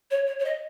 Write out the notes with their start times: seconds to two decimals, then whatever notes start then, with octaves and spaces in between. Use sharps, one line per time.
0.11 C#5
0.27 C#5
0.39 C#5
0.45 D#5